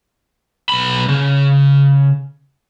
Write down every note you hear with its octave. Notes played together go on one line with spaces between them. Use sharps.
B1 B5
C#3